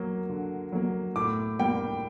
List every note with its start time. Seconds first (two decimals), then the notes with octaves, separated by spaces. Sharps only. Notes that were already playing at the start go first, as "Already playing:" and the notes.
Already playing: F#3 A#3
0.29 D3
0.72 F#3 A#3
1.16 A2 D6
1.59 G3 A#3 G5